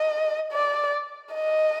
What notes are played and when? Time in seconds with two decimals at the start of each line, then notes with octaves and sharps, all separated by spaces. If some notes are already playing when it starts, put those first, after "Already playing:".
Already playing: D#5
0.52 D5
1.34 D#5